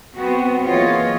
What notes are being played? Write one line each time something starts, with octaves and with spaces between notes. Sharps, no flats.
B3 C4 F#4
E3 A#3 F4 G#4 C#5 D#5